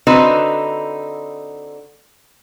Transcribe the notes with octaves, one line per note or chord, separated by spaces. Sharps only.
D3 C4 D#4 F#4 B4